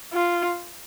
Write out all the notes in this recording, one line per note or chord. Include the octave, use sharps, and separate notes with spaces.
F4